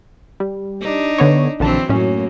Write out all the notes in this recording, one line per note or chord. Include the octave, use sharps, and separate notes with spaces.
G3
D4 D#4
D3 B3 C#5
A#1 D3 E3 F#3 C4 A5
F#2 A2 A#3 C#4